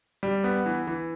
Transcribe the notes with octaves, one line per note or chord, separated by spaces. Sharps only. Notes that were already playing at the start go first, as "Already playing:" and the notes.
G3
B3
E3
E3